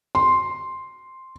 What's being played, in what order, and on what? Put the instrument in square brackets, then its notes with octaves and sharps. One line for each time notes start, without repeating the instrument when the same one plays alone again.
[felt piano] C6